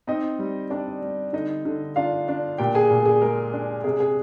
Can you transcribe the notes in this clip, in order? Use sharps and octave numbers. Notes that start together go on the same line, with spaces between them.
C4 D#4 D#5
G3
C4 D4 D5
G3
D3 D#4 D#5
D3
D4 F4 F5
D4
A#2 G4 G5
G#4 G#5
A#2
G#4
G#3 A#4
D4
C3 G#4
G#4